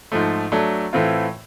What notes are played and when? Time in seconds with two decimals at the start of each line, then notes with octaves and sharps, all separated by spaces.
0.12 G#2 F3 A3
0.52 F#3 A3 D4
0.93 A2 E3 A3 C4 F4